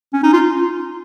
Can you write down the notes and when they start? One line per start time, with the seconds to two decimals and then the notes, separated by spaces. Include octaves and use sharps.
0.13 C#4
0.23 D#4
0.33 F4